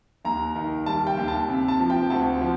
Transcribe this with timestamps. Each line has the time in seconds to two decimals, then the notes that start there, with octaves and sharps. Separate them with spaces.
0.25 D#2 A#5
0.55 D#3
0.86 G3 A5
1.07 G5
1.17 D#2
1.28 A5
1.48 C3
1.68 A5
1.80 F3
1.90 G5
2.10 D2 A5
2.41 F3